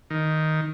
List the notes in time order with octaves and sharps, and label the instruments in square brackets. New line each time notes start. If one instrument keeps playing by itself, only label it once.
[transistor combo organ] D#3